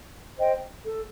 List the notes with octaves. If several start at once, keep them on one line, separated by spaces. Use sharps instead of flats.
C5 D#5 G5
A4